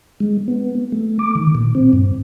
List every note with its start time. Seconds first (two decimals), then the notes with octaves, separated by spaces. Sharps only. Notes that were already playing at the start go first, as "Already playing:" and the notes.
0.20 G#3
0.48 B3
0.92 A3
1.19 D6
1.35 D#3
1.55 A#2
1.75 C4
1.93 G2